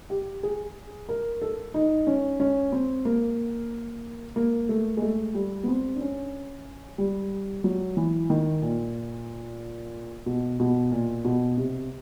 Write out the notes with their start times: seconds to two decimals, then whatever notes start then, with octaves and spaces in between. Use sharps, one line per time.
0.10 G4
0.43 G#4
1.09 A#4
1.42 A4
1.74 D#4
2.07 C#4
2.40 C#4
2.72 C4
3.05 A#3
4.36 A#3
4.69 A3
4.97 G#3
5.02 A3
5.35 G3
5.63 B3
5.68 C4
5.95 D4
6.01 C#4
6.98 G3
7.64 F#3
7.97 E3
8.30 D#3
8.62 A#2
10.26 B2
10.60 B2
10.92 A#2
11.25 B2
11.57 C3